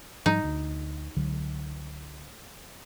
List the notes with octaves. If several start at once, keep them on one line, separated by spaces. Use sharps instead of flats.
G#2 F3 G3 D#4
D2
C#2 D3 F#3